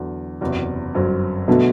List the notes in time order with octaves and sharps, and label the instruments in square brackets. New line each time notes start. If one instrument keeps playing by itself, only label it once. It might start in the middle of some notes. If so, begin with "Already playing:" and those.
Already playing: [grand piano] E2 D3 F#3
F#1 E2 C3 F#3
G1 F#2 F#3 C4
[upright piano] B2 [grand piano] D3 F#3 A3